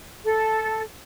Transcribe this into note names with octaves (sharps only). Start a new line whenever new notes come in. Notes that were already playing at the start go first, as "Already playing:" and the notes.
A4